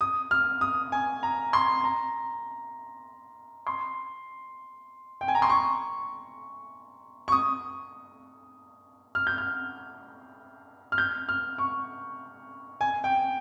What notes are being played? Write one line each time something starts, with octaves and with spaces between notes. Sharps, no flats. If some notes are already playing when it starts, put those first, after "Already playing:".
D#6
F6
D#6
G#5
A#5
C6
A#5
C6
G5
G#5
A#5
C6
C#6
C#6
D#6
F6
G6
F6
F6
G6
F6
C#6
G#5
G5